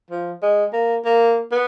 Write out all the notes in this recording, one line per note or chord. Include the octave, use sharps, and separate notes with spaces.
F3
G#3
A#3
A#3
B3